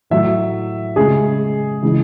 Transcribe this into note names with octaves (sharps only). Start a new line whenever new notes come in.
A2 F#3 E5
C#3 G#3 G#4
C#3 E3 G#3